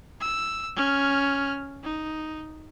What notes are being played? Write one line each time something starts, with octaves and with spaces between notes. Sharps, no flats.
E6
C#4 F6
D#4